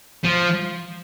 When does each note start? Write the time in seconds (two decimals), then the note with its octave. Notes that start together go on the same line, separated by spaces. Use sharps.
0.24 F3